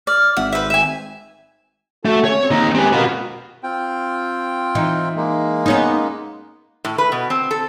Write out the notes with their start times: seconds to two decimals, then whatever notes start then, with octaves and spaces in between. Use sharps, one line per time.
0.07 D5 F6
0.37 G#1 E5 F#5
0.52 B4 C5 E5
0.70 E5 G#5
2.05 A3 F#4 A4 A5
2.25 C#4 C#5
2.39 C4
2.51 D#2 D#4
2.75 G#3 C4 C#4 G4 B4
2.93 F#4 A#4 B4 D#5 F5
3.63 C4 F4 G5
4.75 E3 D#4
5.16 G#3 A#3
5.66 B3 C#4 D#4
6.85 A2
6.98 B4
7.12 B2
7.30 C4
7.51 A4